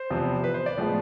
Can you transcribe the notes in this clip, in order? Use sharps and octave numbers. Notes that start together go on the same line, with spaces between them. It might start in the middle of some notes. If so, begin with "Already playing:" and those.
Already playing: C5
E2 C3 F3 B3
B4
C5
D5
A2 F3 G#3 B3